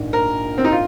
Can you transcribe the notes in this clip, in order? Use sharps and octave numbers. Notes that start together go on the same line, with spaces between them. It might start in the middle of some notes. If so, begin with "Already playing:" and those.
Already playing: A#1 G#2
A#4
C4
D#4
F4